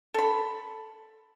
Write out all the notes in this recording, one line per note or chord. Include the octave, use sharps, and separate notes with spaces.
A4 B5